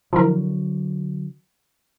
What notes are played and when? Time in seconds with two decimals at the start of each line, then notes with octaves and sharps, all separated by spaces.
0.13 D3 F3 F#3 E4 A#4